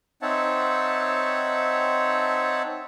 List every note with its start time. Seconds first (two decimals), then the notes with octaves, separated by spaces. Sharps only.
0.22 C4 D#4 C#5 E5 F#5 A5